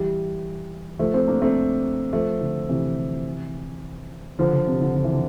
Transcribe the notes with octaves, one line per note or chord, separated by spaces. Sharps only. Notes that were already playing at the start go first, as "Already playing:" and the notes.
Already playing: E3 G3
F3 A3
A3 C4
A#3 D4
A3 C4
F3 A3
D3
C3 E3
D3 F3
D3
C3
D3
D3
E3
D3